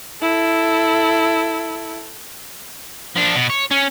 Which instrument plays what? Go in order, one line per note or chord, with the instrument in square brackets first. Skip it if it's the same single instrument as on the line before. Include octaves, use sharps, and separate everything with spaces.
[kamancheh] E4 A4
[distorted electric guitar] F3 D4
B2
C#5
C#4